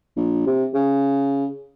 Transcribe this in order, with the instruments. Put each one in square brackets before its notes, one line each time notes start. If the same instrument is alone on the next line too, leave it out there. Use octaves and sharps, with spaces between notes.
[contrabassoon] A#1
C3
C#3